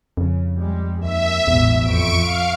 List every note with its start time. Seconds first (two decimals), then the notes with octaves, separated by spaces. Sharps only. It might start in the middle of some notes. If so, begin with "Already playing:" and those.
0.17 F2 C#3
0.57 G3 G#3
1.01 D#2 E5
1.47 A1 E2 G#2 B2
1.82 F2 C#6 D7
2.21 F5